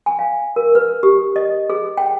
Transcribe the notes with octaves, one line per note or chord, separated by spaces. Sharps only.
G#5
F5
A#4
B4
G4
D#5
G#4
G5